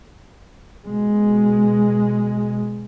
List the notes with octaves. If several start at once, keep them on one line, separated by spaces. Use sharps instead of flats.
B2 G#3